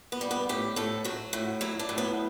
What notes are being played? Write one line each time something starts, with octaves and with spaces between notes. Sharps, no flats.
B3
G3
B3
A2 G4
A2 A4
F#3 F#4
A2
F#3 E4
D4
A2
B3